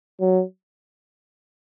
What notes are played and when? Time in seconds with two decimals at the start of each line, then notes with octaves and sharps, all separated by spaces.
0.20 F#3